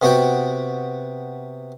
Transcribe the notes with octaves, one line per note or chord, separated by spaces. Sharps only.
C3 B3 F#4 F#5 G5